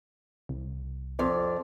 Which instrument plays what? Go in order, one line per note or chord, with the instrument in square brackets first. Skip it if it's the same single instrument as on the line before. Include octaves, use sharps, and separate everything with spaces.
[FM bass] C2
[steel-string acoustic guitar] F2 D5